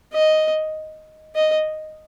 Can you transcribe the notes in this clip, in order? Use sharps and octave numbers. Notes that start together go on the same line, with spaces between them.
D#5
D#5